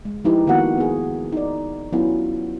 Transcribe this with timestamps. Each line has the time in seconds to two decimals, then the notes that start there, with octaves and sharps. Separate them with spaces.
0.05 G#3
0.24 F3 G#3 D#4 E4 G4 B4
0.47 D#3 A#3 B3 F#4 F#5
0.78 B3 G#4
1.32 D#4 D5
1.93 F#3 B3 C#4 E4 F4